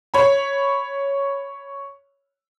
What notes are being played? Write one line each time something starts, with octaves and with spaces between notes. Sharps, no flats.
C#5 B5